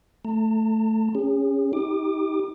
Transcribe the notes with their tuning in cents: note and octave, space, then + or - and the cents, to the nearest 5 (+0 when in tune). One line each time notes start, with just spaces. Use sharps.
A3 +0 A5 +45
C#4 +0 G#4 -35
D#4 +40 G4 +0 D6 +35